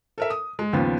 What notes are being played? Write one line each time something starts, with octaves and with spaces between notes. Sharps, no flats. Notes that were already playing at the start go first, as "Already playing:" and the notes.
A4 A#4 E5
D#6
G#3
D#2 C#3 F3 B3